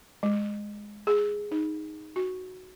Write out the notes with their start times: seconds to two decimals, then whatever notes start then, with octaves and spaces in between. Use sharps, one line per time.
0.23 G#3
1.07 G#4
1.51 D#4
2.16 F#4